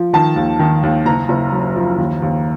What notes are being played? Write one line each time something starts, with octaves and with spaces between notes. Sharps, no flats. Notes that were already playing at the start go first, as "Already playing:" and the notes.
Already playing: F3
D#3 A5
D#2
D#3
D#2
F#1 A#5
F#1
F#2
F3
D#2
D#2